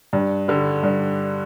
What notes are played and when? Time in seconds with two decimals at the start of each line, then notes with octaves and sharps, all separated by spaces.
0.13 G2
0.48 D3 G3
0.83 G2